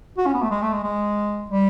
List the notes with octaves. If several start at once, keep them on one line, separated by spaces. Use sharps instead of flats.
F#4
C#4
B3
A3
G#3
A3
G#3
G#3
G3